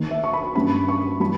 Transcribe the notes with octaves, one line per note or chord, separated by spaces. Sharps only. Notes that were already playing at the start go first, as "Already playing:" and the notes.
Already playing: D#2 D#3 A#3
E5
C#6
B5
G2 G3 A#3 C#4 B5
C#6
E3 G3 B5